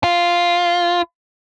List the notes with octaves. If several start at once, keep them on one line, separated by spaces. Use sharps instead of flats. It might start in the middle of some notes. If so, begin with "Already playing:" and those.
F4